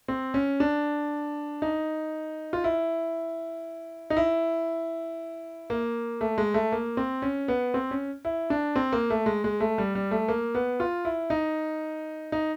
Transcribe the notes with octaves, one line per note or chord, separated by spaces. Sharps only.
C4
C#4
D4
D#4
F4
E4
D#4
E4
A#3
A3
G#3
A3
A#3
C4
C#4
B3
C4
C#4
E4
D4
C4
A#3
A3
G#3
G#3
A3
G3
G3
A3
A#3
B3
F4
E4
D#4
D#4